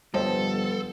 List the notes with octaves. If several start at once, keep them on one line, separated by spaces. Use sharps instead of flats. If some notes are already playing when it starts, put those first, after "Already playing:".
G2 D3 F3 B3 A4 C5 D#5